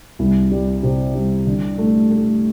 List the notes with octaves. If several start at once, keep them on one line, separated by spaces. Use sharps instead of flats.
C2
G3
C3
G3
D3
A3
A3